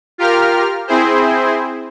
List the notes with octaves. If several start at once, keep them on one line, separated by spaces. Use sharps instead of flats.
F4 G4 A#4 F6
C4 E4 G#4 C5